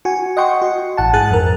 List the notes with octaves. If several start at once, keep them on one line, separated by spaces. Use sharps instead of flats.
F#4 G#5
D#5 F#5 G5 C6 C#6
F#4
A1 F#5 A5
G#2 G#4 F#6 A6
F2 A#4